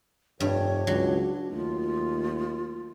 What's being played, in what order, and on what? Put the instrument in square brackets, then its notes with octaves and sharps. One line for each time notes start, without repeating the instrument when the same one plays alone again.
[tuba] F1 [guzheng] G2 [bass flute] D4 [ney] C#5
[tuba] C#2 [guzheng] F#3
[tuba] D#2 [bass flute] A3 [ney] F4